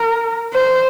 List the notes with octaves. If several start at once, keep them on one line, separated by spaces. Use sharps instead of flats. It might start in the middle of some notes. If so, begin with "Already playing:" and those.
Already playing: A#4
C5